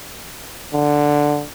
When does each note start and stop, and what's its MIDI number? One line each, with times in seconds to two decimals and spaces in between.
0.74 1.43 50